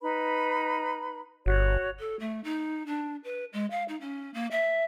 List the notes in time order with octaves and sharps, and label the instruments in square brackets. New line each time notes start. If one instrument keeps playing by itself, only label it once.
[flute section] D#4 B4 B5
[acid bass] G1 [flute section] F#4 C#5
[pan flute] A4
A3
D#4
D4
B4
G#3
F5
D#4
C#4
A#3
E5